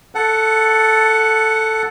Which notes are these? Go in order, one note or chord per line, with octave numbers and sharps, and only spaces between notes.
A4 F#5